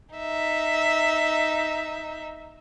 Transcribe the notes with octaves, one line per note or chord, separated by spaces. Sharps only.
D#4 E5